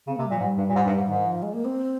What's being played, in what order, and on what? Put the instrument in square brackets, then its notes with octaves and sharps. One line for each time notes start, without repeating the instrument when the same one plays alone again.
[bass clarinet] C#3 [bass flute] C4
[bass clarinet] C3 [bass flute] A#3
[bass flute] G3
[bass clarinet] A#2 [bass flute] F3
[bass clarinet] G#2 [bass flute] G3
[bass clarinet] G2
A#2
G#2
G2
G#2
[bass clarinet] G#2 [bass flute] D#3
[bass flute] F3
G#3
A#3
C4